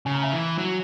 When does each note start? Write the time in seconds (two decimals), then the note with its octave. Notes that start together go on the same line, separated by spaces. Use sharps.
0.06 C#3 G#5
0.14 A#5
0.22 E5 G#5
0.32 E3
0.58 F#3